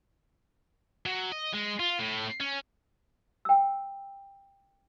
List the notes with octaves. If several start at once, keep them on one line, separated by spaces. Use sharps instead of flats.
F#3
D#5
G#3
F4
A2
C#4
G5 E6